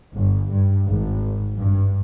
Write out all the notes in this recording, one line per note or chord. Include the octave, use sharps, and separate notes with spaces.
G1
G2
G#1
G2